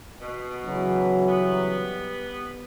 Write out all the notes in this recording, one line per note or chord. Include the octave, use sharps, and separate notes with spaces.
B2
C#3 E3 F#3
G3 B3